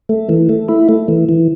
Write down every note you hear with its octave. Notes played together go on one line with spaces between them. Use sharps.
A3
E3
A3
E4
A3
E3
E3